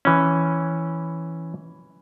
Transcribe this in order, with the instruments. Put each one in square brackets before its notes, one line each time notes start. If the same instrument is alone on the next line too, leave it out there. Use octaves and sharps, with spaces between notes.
[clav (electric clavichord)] E3 C#4